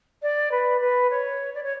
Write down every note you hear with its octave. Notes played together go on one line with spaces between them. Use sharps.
D5
B4
B4
C#5
D5
C#5